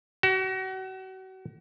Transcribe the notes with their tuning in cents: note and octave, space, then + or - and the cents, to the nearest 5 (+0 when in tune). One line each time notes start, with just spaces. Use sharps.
F#4 +35